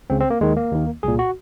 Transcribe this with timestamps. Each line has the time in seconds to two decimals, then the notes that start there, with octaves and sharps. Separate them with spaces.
0.10 C#2 C#3 C4
0.20 C4
0.30 A#3
0.41 D#2 D#3 G#3
0.57 A#3
0.72 D#2 D#3
1.03 C2 A#2 G#4
1.19 F#4